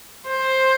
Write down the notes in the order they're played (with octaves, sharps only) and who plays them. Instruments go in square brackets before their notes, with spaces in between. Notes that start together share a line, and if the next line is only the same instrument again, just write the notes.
[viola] C5